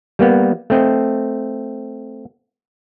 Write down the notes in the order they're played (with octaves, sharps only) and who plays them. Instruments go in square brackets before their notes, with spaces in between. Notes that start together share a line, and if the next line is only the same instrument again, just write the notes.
[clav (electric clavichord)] G3 A#3 B3
A3 C4 D#5